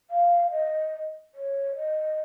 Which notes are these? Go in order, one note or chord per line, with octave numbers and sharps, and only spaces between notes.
F5
D#5
C#5
D#5